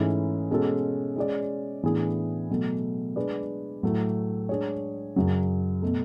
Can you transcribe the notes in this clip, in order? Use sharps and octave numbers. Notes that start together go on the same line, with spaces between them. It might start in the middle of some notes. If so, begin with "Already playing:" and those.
Already playing: G#2 E3 A3 C#4 E4
B2 G#3 C#4 F#4 A4
G#3 C#4 G#4 D5
A2 E3 B3 D4 G#4
B2 F#3 A3
G#3 D4 G#4 B4 D5
A2 F#3 A3
G#3 D4 G#4 C#5
F#2 C#3 F#3
B2 A3